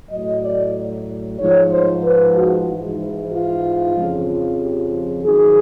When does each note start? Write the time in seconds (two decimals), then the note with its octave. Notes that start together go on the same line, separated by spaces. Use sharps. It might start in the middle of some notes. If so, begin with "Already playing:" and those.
0.10 A2 F#3 D#5
0.42 D5
1.38 G#2 F3 C#5
1.70 C5
2.04 B4
2.35 F#4
2.67 G#2 E3
3.31 F4
3.96 F2 C#3 F3
4.60 G4
4.92 G#4
5.24 G#2 D#3 F#3 G#4